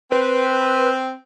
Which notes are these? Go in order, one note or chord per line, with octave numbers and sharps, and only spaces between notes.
C4 B4